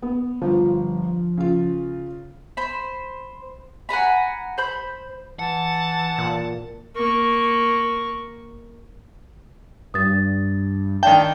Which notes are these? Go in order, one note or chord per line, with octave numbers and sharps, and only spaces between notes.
B3
G1 F3
C#3 F4
C5 B5
F#5 G#5 A#5 B5
C5 B5 G6
E3 F#5 A5
A#2
A#3 C#6
G2 D#6 A6
D#3 D4 F5 G5 A5